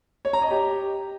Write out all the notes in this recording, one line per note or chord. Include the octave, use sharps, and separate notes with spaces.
C#5
A#5
D#5
G4